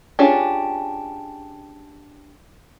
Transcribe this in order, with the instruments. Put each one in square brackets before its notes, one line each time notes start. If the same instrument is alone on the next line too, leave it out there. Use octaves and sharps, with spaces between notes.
[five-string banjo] C#4 D4 F4 G4 G#4